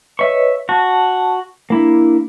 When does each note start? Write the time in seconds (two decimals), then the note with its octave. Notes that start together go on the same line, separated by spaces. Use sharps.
0.19 B4 C#5 D#5 E5 C#6
0.69 F#4 A5
1.70 A#3 D4 E4